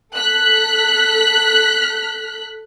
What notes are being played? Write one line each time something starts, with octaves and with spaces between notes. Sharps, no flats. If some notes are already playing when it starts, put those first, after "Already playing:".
A4 F#6 B6